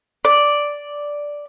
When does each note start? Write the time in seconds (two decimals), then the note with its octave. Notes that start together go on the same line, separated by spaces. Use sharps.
0.25 D5